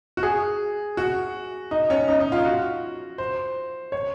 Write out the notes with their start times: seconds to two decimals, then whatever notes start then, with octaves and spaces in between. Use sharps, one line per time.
0.17 F#4
0.23 G#4
0.97 F#4
1.71 D#4
1.90 C#4
2.08 D#4
2.21 D#4
2.32 F4
2.45 F#4
3.18 C5
3.92 C#5